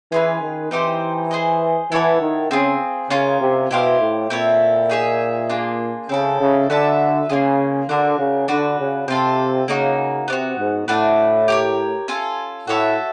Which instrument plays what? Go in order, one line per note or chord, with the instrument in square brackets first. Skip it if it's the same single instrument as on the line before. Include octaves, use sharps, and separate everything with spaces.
[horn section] E3 [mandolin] C#4 F4 G#4 B4
[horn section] D#3
[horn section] E3 [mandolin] C4 D#4 G4 C5
[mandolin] G#4 C5 D#5
[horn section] E3 [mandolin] E4 A4 C#5 F#5
[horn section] D#3
[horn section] C#3 [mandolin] C4 F4 G#4
[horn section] C#3 [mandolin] C#4 F4 A#4
[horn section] C3
[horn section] B2 [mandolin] E4 G4 C5 F5
[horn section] A2
[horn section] A#2 [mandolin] C4 E4 A4 C#5
[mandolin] D#4 G#4 C#5 E5
A#3 D4 F4 G#4
[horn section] C#3 [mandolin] C4 E4 A4
[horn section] C#3
[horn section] D3 [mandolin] F#4 B4 E5 A5
[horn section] C#3 [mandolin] A#3 D4 F4 G#4
[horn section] D3 [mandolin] D4 F#4 A#4
[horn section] C#3
[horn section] D3 [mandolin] D4 F#4 B4
[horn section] C#3
[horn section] C3 [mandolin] C4 F4 A4
[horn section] C#3 [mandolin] A#3 D#4 F#4
[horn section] C3 [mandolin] B3 D4
[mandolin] F#4
[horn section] G#2
[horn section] A2 [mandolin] A3 D4 F#4 B4
[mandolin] G4 A#4 C#5
C#4 F4 A4
[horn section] A2 [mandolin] F#4 A4 C#5 E5